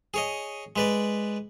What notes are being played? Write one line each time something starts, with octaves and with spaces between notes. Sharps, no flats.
G#4 C#5 D#5
G#3 B4 D5